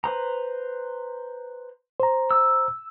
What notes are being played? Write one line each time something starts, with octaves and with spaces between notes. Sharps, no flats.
B4 C5 A#5
C5 A#5
E6